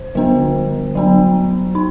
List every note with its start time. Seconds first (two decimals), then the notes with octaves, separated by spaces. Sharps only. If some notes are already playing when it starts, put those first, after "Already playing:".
Already playing: C5
0.15 D3 G3 B3 D4
0.95 F#3 B3 D4
1.75 D#4